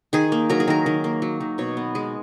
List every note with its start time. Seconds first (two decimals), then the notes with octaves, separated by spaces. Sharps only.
0.13 D#3 G#4
0.32 A#3
0.50 F#3 A#4
0.60 G#4
0.68 D#3 A#4
0.86 D#3
1.04 A#3
1.22 F#3
1.40 D#3
1.58 B2 C#5
1.77 B3
1.95 G#3